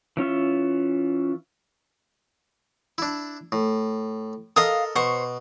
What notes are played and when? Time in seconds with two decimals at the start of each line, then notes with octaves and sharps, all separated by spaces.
0.17 E3 C#4 F4 E5
2.98 D4 E4
3.52 A2
4.56 A4 A#4 D#5 F5 D#6
4.96 B2 C5 C#6